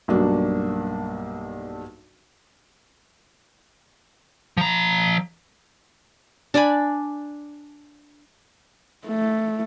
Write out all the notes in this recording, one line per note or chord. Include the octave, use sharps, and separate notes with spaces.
B1 G2 A#3 D4 F#4
F3 A#5
D4 D5 G#5 B5
A3